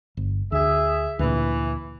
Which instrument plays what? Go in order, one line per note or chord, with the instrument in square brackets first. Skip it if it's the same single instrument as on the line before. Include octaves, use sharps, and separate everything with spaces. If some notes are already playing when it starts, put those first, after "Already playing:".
[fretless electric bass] G1
[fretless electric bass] D2 [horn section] G#4 E5
[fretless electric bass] D2 A#2 [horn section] E3